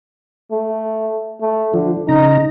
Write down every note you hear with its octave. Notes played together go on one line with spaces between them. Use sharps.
A3
A3
D3 F3
C#3 D#4 A#5